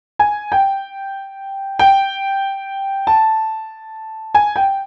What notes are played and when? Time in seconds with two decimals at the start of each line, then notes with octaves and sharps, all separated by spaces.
0.19 G#5
0.52 G5
1.79 G5
3.07 A5
4.35 G#5
4.56 G5